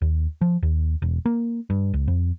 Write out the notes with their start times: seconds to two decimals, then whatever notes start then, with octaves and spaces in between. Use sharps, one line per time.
0.02 D#2
0.41 F3
0.63 D#2
1.02 E1
1.26 A#3
1.70 G2
1.94 C#2
2.08 F2